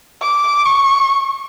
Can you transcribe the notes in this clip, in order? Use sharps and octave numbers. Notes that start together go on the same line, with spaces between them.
D6
C#6